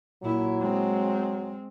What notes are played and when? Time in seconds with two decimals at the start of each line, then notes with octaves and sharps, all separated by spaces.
0.23 A#2 F#3 E4
0.61 G#3 C4